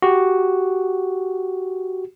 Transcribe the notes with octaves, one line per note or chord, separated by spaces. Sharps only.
F#4 G4